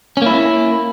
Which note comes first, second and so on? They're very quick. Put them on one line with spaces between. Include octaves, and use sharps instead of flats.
C#4 A#3 E4